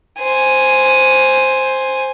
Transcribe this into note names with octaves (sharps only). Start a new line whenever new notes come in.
C5 G#5